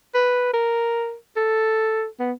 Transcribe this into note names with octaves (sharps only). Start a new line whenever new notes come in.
B4
A#4
A4
B3